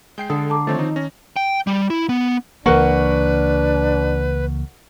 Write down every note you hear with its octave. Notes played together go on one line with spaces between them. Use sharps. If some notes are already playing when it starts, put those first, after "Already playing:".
G#3 G5 G6 C7
D3 A4 D#6
A5 A#5 D6
D#3 F3 A3 C4 C#5 A6
D#4
C#4 A#6
G5
G3
E4
B3
C#2 E3 A#3 D4 A#4 B4 F#5 C#6